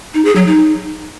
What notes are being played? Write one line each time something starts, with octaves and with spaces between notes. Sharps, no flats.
D#4
G#4
F#3
D#4